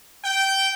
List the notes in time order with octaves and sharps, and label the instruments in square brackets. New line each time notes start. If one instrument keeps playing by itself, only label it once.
[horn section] G5